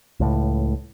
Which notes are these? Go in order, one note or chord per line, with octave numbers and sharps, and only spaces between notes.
C#2 A2